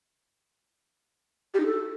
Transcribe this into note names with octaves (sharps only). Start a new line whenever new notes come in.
G4
D#4
A4